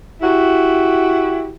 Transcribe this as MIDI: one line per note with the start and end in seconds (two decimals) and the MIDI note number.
0.21 1.52 64
0.21 1.52 66
0.21 1.52 67